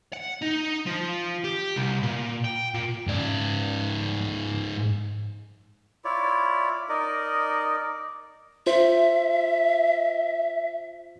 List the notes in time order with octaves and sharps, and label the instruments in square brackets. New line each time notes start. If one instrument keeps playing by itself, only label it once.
[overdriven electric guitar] F#5
D#4
F3
G4
C2
A#2
G5
A#2
[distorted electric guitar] G#2 D5
[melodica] E4 F4 C#5 D5
D#4 A#4 D5 D#5
[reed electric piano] F4 C5 [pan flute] E5